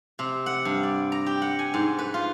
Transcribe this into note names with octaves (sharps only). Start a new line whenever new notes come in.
C3
F#5
G2
D5
A#5
G4
F#5
G#5
G#2
B4
F4